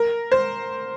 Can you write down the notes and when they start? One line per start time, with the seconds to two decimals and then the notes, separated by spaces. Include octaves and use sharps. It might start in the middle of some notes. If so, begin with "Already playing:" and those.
Already playing: A#4
0.32 C5